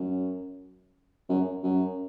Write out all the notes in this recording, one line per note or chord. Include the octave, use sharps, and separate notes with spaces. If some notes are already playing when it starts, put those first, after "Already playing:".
Already playing: F#2
F#2
F#2